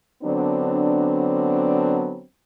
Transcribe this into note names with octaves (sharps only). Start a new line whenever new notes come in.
D3 F#3 B3 C4 D4